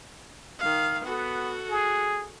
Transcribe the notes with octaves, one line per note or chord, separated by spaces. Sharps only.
D#3 F5
B3 F#4 A4
G#4